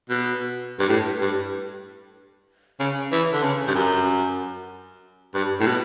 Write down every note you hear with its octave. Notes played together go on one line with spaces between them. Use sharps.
B2
G2
A2
G2
C#3
E3
D3
C#3
G2
F#2
G2
A2
B2